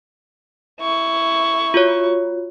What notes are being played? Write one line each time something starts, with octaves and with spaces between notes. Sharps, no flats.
E4 C#6
F4 F#4 C#5